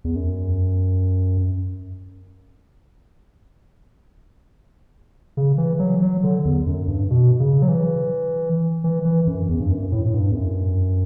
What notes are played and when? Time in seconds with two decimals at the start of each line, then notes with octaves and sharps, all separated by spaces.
0.04 E2
0.16 F#2
5.37 C#3
5.58 E3
5.79 F#3
6.02 F#3
6.24 D3
6.45 E2
6.67 F#2
6.88 G2
7.10 B2
7.40 C#3
7.62 F#3
7.68 E3
8.84 E3
9.05 E3
9.27 F#2
9.49 E2
9.60 G2
9.71 F#2
9.92 A2
10.06 A2
10.14 G2
10.32 E2
10.35 F#2